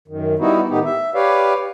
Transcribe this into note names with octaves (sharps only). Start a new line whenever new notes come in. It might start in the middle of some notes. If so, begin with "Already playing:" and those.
F#2 D#3
G3 B3 D#4 E4 F#4
A2 D#3 B3 D#4 G4
E5
G4 B4 C#5 D5 F5